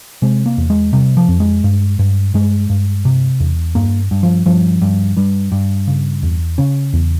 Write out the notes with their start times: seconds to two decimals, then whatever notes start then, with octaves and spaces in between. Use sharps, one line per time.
0.22 C3 G#3
0.46 A#3
0.58 E2
0.70 G#3
0.93 C3 G3
1.17 F3
1.28 F2
1.40 G#3
1.64 G2
1.99 G2
2.34 G2 G#3
2.70 G2
3.05 C3
3.40 E2
3.75 G2 A#3
4.11 G2
4.23 F3
4.46 G2 F3
4.82 G2
5.17 G2 G3
5.52 G2
5.88 C#3
6.23 E2
6.58 C#3 C#4
6.93 E2